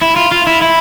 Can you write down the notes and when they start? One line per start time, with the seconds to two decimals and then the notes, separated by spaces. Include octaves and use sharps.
0.01 E4
0.16 F4
0.31 F4
0.47 E4
0.61 E4